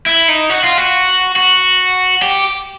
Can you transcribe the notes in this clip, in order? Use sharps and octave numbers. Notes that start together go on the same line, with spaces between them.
E4
D#4
F#4
F4
F#4
F#4
G4